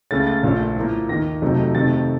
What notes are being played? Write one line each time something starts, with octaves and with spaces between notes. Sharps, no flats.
C#2 C#3 A3 C#4 A6
A6
A#1 A#2 F3 A3 C#4
A2 F3 A#3
D#2 D#3 A#3 A#6
F2 C3 F#3 A3 D#4
F2 C3 D#3 A3 D#4 A6